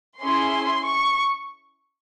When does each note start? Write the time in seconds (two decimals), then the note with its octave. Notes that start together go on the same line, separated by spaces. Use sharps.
0.20 C#4 E4 G#4 C6
0.86 C#6